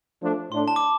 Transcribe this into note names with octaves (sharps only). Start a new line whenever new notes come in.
F3 A3 D4
A2 A3 D4 C6
A5
D6